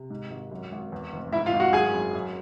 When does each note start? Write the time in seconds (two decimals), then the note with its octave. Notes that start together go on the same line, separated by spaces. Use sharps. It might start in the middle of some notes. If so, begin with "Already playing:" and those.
Already playing: C3
0.10 G#2
0.30 G#1
0.51 F#2
0.72 G#1
0.92 E2
1.12 F1
1.33 G#2 E4 E5
1.46 F4 F5
1.53 G#1
1.60 F#4 F#5
1.73 F#2 G#4 G#5
1.93 F#2
2.15 F#2